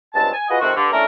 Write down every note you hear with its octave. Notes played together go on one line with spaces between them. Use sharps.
C#2 G2 G#3 C4 A5
G#5
F4 F#4 G#4 B4 D#5
C3 D#3 A3 C4 F4 F#4
G2 D3
A3 C#4 D4 E4 A4 A#4